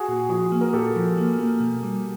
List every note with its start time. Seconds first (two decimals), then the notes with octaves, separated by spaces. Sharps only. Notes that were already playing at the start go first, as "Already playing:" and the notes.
Already playing: F#4 G#4
0.09 A#2
0.29 F3 F#4 G#4
0.52 A#3
0.61 A#4
0.73 A#2 G4 A4
0.96 F3
1.17 A#3
1.39 A#3
1.60 B2
1.83 G3